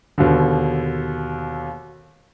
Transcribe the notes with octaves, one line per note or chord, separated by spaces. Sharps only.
D#2 B2 D3